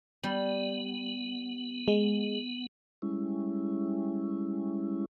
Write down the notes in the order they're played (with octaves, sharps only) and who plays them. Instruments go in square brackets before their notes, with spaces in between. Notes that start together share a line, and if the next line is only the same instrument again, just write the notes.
[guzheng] G3 [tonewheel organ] B3
[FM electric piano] G#3
[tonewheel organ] G3 G#3 C#4 E4